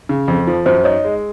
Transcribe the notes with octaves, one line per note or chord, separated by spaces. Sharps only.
C#3
F2
F3
F#2 C5
D#4 C#5
G#3